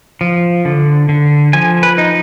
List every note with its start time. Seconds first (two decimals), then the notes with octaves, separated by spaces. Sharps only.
0.21 F3
0.65 D3
1.09 D3
1.53 F3 G#5
1.83 B4
1.98 D#4